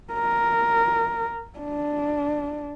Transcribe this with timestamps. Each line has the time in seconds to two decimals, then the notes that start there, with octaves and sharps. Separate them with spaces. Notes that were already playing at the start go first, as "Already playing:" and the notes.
0.13 A#4
1.59 D4